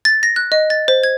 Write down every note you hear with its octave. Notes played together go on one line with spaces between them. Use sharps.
A6
A#6
F#6
D#5
A6
C5
G#6